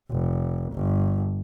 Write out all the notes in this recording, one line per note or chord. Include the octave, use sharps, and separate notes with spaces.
F1
G1